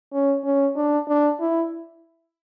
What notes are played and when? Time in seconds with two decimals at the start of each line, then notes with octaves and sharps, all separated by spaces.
0.13 C#4
0.44 C#4
0.76 D4
1.08 D4
1.40 E4